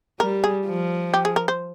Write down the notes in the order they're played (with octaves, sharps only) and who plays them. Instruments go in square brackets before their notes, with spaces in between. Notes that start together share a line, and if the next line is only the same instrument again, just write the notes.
[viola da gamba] G3 [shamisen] A#4
[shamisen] G#4
[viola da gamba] F3
[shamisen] G4
G#4
A#4
C5